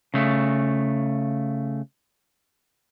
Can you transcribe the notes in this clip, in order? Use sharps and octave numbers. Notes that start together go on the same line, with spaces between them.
C#3 A3